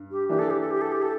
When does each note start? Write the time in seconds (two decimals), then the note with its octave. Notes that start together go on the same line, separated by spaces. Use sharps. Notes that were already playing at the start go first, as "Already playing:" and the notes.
Already playing: G2
0.11 G4
0.29 E3 A#3 D4 G4
0.39 A4
0.50 G4
0.61 A4
0.71 G4
0.81 A4
0.92 G4
1.02 A4